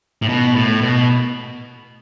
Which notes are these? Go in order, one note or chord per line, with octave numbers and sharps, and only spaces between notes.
A2
B2
A2
B2